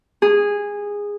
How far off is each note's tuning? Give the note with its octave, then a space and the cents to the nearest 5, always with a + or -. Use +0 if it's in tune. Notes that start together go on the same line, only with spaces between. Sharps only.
G#4 -15